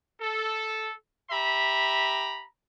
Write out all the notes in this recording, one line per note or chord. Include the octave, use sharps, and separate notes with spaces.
A4
G4 E5 A#5 B5